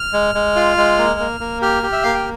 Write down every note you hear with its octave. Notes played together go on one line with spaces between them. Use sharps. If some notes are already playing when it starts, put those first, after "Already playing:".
Already playing: F6
G#3
G#3
F4
G#3
A#3
A#3
A#3
G4 F6
G4
E5
A#3 F5
G5